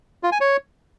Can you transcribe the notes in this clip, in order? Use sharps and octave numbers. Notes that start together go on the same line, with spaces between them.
F4
G#5
C#5